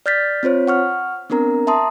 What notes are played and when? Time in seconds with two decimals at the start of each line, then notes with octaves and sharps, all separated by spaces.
0.06 D5 F6 G6 A6 B6
0.43 C4 F4 C5 C#5
0.68 F#5 C#6 F6
1.30 B3 C4 D4 A#4 A#5
1.67 E5 A5 A#5 C6 D#6